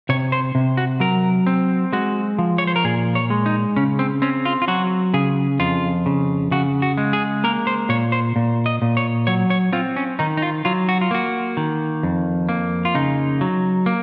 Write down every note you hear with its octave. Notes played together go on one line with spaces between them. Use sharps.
C3 C#5
C5
C3
F#4
F#3 A#4
C4
G#3 F#4
F3
C#5
C5
A#4
A#2 G#4
C#5
G#3
D#4
C#3 C#4
C4
C4 C#4
F4
F4
F#3 F#4
C#3 G#4
F2 F4
C#3
C#3 F#4
F#4
G#3
G#4
A#3 A#4
C5
A#2 C#5
C5
A#2
D#5
A#2
C#5
F#3 C#5
C#5
C4 F4
C#4
D#3 D#4
D#4
F4
F#3 F4
F#4
F4
A#3 F#4
D#3
F2
A#3
F4
C#3 D#4
F#3
A#3